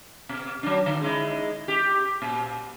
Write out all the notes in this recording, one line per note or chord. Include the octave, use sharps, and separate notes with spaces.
B2
F#3 D4
D3
G#3 D#4 E4
G4
A#2